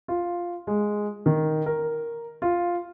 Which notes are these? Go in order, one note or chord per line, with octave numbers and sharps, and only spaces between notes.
F4
G#3
D#3
A#4
F4